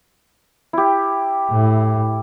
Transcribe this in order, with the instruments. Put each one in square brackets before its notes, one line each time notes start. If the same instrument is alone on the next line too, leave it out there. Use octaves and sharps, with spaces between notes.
[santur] E4 G4
[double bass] A2